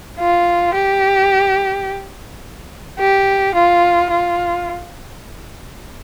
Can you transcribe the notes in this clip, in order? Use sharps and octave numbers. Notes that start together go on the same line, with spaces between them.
F4
G4
G4
F4
F4